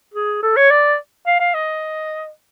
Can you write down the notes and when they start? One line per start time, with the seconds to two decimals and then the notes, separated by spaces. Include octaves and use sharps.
0.14 G#4
0.43 A4
0.57 C#5
0.71 D5
1.27 F5
1.40 F5
1.54 D#5